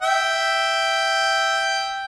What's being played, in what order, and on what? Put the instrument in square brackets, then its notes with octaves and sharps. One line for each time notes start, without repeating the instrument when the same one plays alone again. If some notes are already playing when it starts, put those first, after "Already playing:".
[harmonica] E5 G5